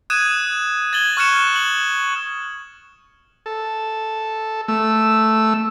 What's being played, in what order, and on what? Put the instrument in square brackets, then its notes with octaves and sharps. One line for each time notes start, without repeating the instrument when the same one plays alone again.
[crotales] D#6 F#6 G#6 D#7 E7
G#6 A6 F#7 G7
C#6 F6 F#6 G#6 C#7 E7
F#7
[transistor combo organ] A4
A3 E6